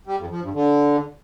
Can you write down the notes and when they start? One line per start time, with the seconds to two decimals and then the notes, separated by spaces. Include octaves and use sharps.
0.07 G3
0.19 F2
0.30 F3
0.42 G2
0.54 D3